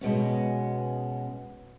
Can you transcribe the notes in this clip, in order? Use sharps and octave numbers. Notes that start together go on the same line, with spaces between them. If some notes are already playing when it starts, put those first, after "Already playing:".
B2 G#3 B3 C#4